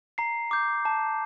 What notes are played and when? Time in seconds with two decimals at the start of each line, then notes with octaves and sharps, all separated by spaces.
0.18 A#5 C7
0.51 D6 G6
0.85 A5